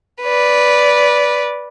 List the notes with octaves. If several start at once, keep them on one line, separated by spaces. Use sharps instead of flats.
B4 D5